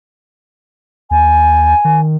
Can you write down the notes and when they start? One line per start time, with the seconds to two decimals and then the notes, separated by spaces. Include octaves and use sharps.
1.11 D#2 G#5
1.85 D#3